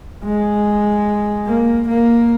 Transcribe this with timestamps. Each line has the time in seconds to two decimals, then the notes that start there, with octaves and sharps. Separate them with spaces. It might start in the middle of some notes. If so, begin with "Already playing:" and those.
0.24 G#3
1.47 A#3
1.87 A#3